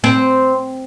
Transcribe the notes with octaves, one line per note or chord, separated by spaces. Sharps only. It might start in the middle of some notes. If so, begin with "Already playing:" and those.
C4